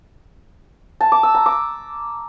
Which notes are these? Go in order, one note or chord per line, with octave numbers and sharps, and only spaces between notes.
A5
D6
E6
A#5
D6